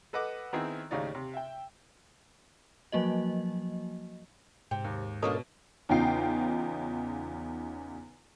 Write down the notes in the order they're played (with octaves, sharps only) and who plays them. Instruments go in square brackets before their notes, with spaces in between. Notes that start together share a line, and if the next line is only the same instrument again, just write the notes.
[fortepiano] A4 B4 D#5 F#5 D6
D#3 B3 C4 D#4 E4 G#4
D#2 A2 C#3 D#4 C#5 D5
C3
E5 G5
[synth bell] F3 F#3 A#3 F#4 D#5
[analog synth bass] G#2 [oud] C3 [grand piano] G5
[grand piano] D#2
[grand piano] B2 [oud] C#4 D4 F4 [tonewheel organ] A4 A#4 D#5
[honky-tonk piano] E2 C#3 D#4 F4 G5 C7